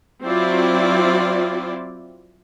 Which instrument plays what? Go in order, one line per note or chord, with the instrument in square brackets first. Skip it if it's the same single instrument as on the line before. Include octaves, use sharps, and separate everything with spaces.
[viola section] F#3 C4 E4 F4 D5